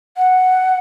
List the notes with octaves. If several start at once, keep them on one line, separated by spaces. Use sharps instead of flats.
F#5